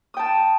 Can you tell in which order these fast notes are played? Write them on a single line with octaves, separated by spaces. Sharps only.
D#6 G5 A5